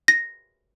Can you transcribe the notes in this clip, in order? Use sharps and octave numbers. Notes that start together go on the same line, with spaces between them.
A#6